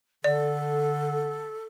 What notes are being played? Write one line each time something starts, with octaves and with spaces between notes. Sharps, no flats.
D3 A4 D5